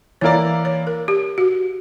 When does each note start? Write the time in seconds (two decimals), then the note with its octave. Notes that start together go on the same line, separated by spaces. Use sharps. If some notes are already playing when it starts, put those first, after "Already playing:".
0.21 E3 A#3 E4 A#4 C#5 D5
0.65 C#5
0.87 A#4
1.08 G4
1.38 F#4